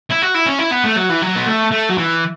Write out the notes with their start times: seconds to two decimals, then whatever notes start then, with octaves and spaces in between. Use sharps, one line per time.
0.10 E4
0.22 F#4
0.34 E4
0.46 C#4
0.59 E4
0.72 B3
0.85 A3
0.97 F#3
1.10 E3
1.22 F#3
1.36 B3
1.47 A3
1.72 A3
1.90 F#3
1.98 E3